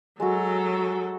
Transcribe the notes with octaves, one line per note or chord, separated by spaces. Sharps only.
F#3 G#3 F#4 A4